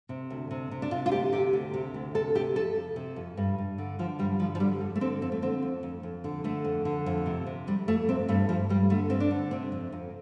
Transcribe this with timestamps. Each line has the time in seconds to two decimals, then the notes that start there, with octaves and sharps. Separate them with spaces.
0.09 C3
0.30 D2
0.51 C3
0.71 C3
0.82 D4
0.91 C3 F4
1.06 F4
1.12 D2 G4
1.32 C3 G4
1.53 D2
1.74 C3
1.94 D2
2.15 C3 A4
2.35 C3 G4
2.56 F2 A4
2.76 F2
2.96 C3
3.16 F2
3.37 G2
3.58 G2
3.78 D3
3.99 D3 F3
4.19 G2 G3
4.39 D3 F3
4.55 F3
4.60 D3 G3
4.81 F2
4.96 A3
5.01 D3 C4
5.22 F2 C4
5.32 A3
5.42 D3 C4
5.62 F2
5.83 F2
6.03 F2
6.24 D3
6.44 D3 A3
6.65 F2
6.85 D3
7.06 F2
7.26 C3
7.47 C3
7.67 F2 G3
7.88 F2 A3
8.09 C3 C4
8.28 G2 A3
8.49 G2 F3
8.69 G2 G3
8.90 D3 A3
9.10 G2 C4
9.20 D4
9.31 D3
9.51 C3 C4
9.72 F2
9.92 F2